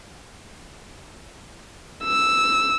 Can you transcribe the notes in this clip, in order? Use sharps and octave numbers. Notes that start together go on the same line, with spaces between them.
E6